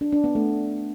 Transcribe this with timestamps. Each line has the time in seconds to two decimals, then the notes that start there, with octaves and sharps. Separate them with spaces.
0.01 D4
0.12 D4
0.24 B3
0.35 A3